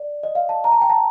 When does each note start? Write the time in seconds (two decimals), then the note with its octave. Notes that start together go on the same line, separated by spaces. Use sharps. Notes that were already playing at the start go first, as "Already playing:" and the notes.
Already playing: D5
0.23 D#5
0.35 F5
0.49 A5
0.64 A#5
0.72 A5
0.81 G5
0.90 A5